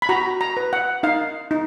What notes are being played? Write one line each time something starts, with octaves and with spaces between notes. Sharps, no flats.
B5
F#4 A#5
A#5
B4
F#5
D#4 F5
D#4